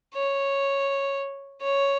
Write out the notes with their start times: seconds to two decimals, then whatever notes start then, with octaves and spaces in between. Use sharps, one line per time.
0.14 C#5
1.62 C#5